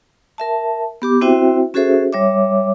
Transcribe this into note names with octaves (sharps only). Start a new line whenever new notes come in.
A#4 E5 A5
B3 G4 D6
C4 E4 F#4 C5 E5 G5
C#4 F#4 G#4 A4 C5 E5
G3 C#5 E5 D6